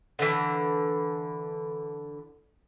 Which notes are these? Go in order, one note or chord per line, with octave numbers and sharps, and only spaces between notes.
D3 E3